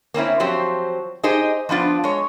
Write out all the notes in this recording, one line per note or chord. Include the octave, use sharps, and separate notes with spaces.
A#3 C4 C#4 E4
F3 F#3 C4 G4 C5
D#4 G4 G#4 C5 D#5
F3 B3 D4 F4
G#3 C#5